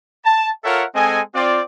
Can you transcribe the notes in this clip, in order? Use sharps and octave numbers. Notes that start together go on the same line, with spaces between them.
A5
F4 A4 A#4 C#5 E5 F#5
G#3 C4 A4 D#5 G#5
C4 F4 D5